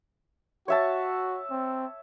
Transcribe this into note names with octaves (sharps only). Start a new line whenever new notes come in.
F#4 C#5 E5 A5
C4